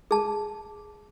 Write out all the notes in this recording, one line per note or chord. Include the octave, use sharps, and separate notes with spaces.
G#4 A5